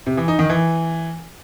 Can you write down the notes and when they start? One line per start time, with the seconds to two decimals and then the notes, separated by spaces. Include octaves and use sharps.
0.06 C3
0.17 E3
0.28 D#4
0.39 D#3
0.50 E3